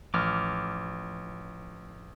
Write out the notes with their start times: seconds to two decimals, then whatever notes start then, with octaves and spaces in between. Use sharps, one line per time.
0.14 A1 F3 D6 F6